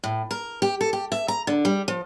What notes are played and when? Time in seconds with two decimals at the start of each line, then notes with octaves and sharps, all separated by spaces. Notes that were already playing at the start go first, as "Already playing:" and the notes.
0.04 A2
0.31 A#4
0.62 G4
0.81 A4
0.93 G4
1.12 E5
1.28 A#5
1.47 D3
1.65 G3
1.88 F3